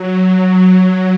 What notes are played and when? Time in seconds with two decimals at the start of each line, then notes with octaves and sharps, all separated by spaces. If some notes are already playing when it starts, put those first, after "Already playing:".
Already playing: F#3
0.41 F#3